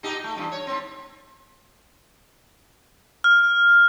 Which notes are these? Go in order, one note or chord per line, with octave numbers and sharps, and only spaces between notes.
A#2 D#4 G4
A3
E2 G2
C#5
G#2 C4
F6